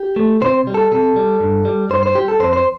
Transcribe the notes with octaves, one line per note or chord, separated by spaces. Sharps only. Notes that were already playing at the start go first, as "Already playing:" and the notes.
Already playing: G4
A3
C3 C5
G3
A4
C3 A4
G3
G2
G3
G2 C5
C5
G3 G4
A4
F2 C5
C5